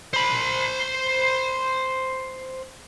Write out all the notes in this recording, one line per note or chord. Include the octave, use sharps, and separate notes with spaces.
C5 B5